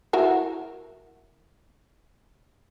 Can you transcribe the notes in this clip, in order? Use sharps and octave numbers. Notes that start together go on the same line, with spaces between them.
E4 F#4 A#4